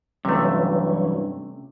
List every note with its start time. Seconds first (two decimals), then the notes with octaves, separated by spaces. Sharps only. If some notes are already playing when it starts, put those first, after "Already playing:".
0.25 G2 C3 E3 F#3 A3 C#4